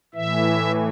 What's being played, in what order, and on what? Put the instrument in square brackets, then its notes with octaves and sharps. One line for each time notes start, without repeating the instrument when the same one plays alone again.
[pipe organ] A2 E3 E5